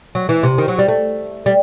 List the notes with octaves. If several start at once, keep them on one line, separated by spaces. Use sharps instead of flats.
F#3
E3
C3
D#3
F#3
G3
A3
G3